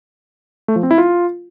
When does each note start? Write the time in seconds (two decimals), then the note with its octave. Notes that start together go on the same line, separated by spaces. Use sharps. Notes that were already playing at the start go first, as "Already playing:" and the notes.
0.68 A3
0.76 F3
0.83 C4
0.91 E4
0.98 F4